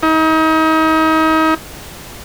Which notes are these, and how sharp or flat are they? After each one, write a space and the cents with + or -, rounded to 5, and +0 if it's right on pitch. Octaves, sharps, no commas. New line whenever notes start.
D#4 +35